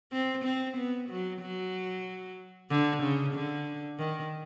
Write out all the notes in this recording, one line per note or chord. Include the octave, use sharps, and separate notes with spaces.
C4
C4
B3
F#3
F#3
D3
C#3
D3
D#3